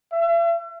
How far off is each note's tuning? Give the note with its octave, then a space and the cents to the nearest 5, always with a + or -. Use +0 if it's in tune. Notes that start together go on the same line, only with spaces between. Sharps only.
E5 +45